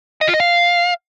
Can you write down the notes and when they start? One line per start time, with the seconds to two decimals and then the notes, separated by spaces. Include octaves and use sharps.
0.21 D#5
0.27 F4
0.34 D#5
0.40 F5